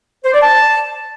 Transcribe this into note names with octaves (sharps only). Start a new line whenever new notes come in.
C5
D5
A5